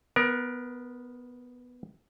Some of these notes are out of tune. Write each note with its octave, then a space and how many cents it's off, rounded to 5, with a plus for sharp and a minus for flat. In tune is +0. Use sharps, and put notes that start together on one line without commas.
B3 +0 A#4 +25